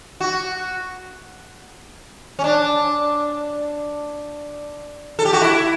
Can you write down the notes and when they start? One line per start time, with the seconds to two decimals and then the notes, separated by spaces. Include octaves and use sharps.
0.21 F#4
2.39 C#4
2.44 D4
5.19 A4
5.25 G4
5.33 F#4
5.41 E4